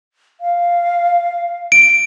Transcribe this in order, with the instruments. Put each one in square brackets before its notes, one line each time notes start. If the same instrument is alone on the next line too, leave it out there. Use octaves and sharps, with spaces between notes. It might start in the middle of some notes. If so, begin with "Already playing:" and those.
[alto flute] F5
[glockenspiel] D7